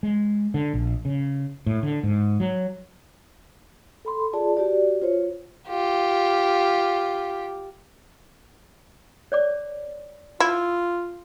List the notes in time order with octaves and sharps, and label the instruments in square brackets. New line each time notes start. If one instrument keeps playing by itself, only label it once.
[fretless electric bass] G#3
D3
A#1
C#3
A2
D3
G#2
F#3
[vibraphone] A4 B5 C6
F4 G#4 D5 A5
F#4 G4 D5
F4 C5 C#5
[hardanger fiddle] F4 G4
[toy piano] C#5 D5 D6
[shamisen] E4 [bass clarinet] F4